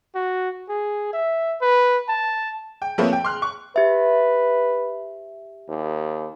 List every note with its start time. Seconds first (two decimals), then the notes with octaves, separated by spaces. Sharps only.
0.15 F#4
0.69 G#4
1.13 E5
1.62 B4
2.09 A5
2.82 G5
2.98 F3 A3 A#3 C4 B4 C#5
3.13 G5
3.24 C6 F6 F#6
3.42 C#6
3.76 G4 B4 E5
5.68 D#2